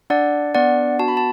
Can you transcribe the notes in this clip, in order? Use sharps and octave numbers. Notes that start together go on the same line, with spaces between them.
D4 D5 F#5
B3 D5 F#5
F#4 A5
B5
A5